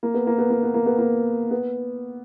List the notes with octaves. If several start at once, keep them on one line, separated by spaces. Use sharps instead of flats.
A#3
B3
A#3
B3
A#3
B3
A#3
B3
A#3
B3